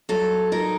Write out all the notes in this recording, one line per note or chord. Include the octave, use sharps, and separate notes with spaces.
F#3 A4
D#4 A#4